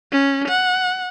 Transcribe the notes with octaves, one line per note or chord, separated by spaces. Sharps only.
C#4
F#5